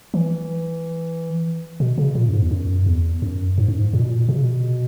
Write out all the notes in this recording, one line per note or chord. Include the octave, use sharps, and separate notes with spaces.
E3
B2
C#3
A#2
F#2
G#2
E2
F#2
E2
F#2
G#2
F#2
G#2
A#2
B2
A#2
B2
C#3
B2